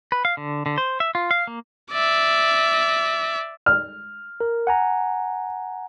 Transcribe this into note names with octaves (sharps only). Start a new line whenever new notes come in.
B4
F5
D3
D3
C5
E5
F4
F5
A#3
D5 E5
F6
A#4
F#5 G#5 A#5